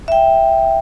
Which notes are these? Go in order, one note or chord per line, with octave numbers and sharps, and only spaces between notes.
E5 G5